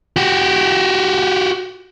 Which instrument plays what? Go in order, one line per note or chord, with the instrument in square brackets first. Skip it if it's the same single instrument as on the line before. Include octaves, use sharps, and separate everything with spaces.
[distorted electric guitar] F#4 G4